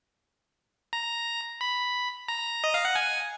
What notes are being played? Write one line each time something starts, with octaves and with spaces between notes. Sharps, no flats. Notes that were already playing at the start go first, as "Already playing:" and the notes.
A#5
B5
A#5
D#5
F5
F#5
G#5